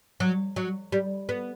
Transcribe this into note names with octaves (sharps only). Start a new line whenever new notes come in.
F#3
F#3
G3
B3